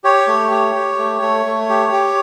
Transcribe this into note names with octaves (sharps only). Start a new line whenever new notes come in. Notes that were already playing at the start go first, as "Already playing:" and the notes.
G4 C#5
A3
G4
G4
A3
A3
A3
G4
G4